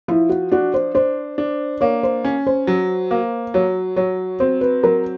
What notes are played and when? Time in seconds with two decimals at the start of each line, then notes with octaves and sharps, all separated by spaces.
0.08 F3 E4
0.30 F#4
0.51 D4 F#4
0.74 C5
0.95 D4 C5
1.38 D4
1.81 A#3 C#5
2.03 C5
2.24 C#4
2.47 C5
2.67 F#3
3.11 A#3
3.54 F#3 C#5
3.96 F#3 C#5
4.40 C4 C5
4.61 B4
4.83 F#3 A#4